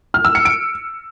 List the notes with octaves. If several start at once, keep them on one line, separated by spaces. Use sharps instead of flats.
F6
E6
C#7
D7